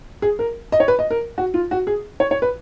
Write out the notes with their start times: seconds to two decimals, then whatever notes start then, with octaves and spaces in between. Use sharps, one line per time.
0.22 G#4
0.39 A#4
0.72 D#5
0.80 C#5
0.88 B4
0.99 D#5
1.10 A#4
1.38 F#4
1.54 F4
1.71 F#4
1.87 G#4
2.20 C#5
2.31 C#5
2.42 B4